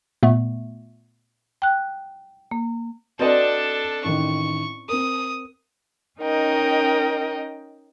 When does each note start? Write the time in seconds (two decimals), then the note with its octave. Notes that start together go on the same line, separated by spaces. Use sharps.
0.23 A#2 A3 B3
1.62 G5 F#6
2.51 A#3
3.19 C4 D4 F#4 A4 B4 D5 D#5 A5
4.04 A1 D#3 C#6
4.88 C4 A#4 D#6
6.20 C#4 D#4 A#4 D#5 G5